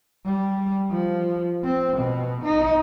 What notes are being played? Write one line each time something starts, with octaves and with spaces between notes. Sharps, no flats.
G3
F3
C4
B2
D#4